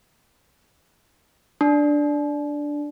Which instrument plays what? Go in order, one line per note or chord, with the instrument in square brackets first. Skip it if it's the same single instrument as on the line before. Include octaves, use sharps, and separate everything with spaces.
[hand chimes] D4